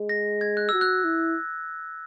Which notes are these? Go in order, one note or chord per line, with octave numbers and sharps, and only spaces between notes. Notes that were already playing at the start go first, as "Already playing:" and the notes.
Already playing: G#3
A#6
G#6
F#6
F#4 E6
F#6
E4